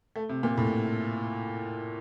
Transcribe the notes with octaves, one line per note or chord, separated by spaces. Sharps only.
A3
C3
A#2
A2